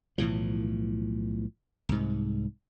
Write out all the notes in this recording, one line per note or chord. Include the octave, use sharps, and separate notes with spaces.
B1 A2 E3 F3
C2 G#2